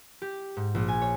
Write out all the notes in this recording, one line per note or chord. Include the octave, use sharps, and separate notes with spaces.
G4
G#2
A#1
G#5
C#5